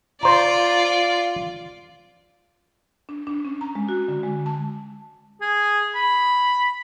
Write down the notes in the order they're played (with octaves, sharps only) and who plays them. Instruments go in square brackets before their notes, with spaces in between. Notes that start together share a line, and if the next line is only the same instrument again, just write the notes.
[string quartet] F4 [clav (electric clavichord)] C5 A#5 [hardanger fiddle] D5
[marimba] D4
D4
C#4
A#5
G#3
F#4
D3
G#3
A5
[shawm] G#4
B5